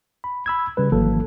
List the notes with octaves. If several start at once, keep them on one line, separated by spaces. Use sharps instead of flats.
B5
B5 E6 G#6
C#3 G3 B4
G#1 E3 F#3 A#3 A4